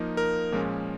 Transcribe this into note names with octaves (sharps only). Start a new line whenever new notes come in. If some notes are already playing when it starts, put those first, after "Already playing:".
Already playing: F3 A#3 D#4
A#4
A#2 F3 G#3 C#4